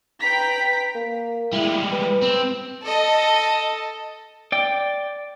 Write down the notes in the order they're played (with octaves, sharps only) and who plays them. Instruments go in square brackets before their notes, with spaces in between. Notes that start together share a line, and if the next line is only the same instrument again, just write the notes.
[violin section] B4 G5 A#5 B6
[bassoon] A#3
[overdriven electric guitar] G3 G#3 [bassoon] E4
[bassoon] B4
[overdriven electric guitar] C4
[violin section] A4 D#5
[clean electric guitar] D5 G5